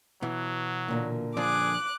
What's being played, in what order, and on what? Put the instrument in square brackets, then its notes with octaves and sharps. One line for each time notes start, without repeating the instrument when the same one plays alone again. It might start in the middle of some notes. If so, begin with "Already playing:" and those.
[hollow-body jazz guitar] B2 E3 [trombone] F#3
[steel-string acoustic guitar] A#2 D3 A#3
[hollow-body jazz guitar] F3 D4 D5 [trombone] G#4 [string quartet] D6 F#6